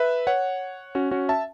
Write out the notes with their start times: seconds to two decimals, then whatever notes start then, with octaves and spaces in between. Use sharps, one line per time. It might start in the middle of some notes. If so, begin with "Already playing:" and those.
Already playing: B4 E5
0.27 C#5 F#5
0.95 C#4 F#4
1.11 C#4 F#4
1.29 E5 A5